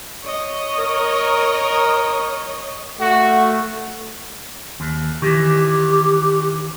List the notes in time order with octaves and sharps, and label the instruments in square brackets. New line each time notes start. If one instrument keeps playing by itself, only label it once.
[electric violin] C#5 D#5
[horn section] A#4
[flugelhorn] A3 [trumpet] F#4
[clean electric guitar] D#2
[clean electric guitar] D#3 E3 [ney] G4